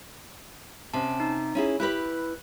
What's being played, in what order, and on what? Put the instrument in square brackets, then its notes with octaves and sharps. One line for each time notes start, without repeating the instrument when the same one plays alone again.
[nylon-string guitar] C3 [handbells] C#4 A5
[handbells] D#4
[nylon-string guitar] C#4 E4 G#4
[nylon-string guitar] E4 G4 B4 [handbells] F#6